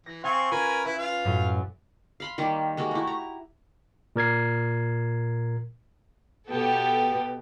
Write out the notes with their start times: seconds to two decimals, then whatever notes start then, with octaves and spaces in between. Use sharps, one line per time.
0.06 E3 A#6
0.24 C4 F5 G#5 C6 C#6
0.51 C#4 F4 A#4 B4 G#5
0.85 E4 B4
0.99 F4 F5
1.25 F#2 A2
2.20 F5 B5 C6
2.38 D#3 G3 A#3 G4
2.77 G#3 A#3 F#4 G4
2.91 A3 E4
3.07 A#5
4.16 A#2 A#4 G#6 C7
6.50 B2 B3 G4 A4